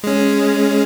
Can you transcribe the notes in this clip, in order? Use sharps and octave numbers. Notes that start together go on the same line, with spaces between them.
G#3 C#4